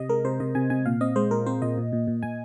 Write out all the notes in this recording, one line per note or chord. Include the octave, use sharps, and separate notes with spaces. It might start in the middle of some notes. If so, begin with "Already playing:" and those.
Already playing: C3 D#5
G#3 A#4
C3 C5
C3 D#5
C3 G#5
C3 G#5
A#2 F5
C4 D#5
G#3 C5
A#2 A#4
C4 C5
A#2 D#5
A#2
A#2
A#2
A#2 G#5